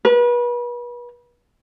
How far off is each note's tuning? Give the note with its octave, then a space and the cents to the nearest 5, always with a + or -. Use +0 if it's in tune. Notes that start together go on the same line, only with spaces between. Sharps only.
B4 -35